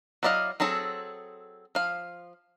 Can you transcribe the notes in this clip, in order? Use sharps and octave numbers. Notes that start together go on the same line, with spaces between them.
F#3 E4 D5 D#5 F5
F#3 C4 G#4 A4
F3 F5